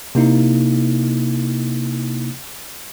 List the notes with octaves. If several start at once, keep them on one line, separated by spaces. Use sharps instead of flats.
C3 A#3 D#4 E4